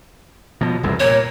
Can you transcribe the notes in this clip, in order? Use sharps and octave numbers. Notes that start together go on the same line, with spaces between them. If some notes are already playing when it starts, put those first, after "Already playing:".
B2 F3
E1 C2 F#2
A#2 C#5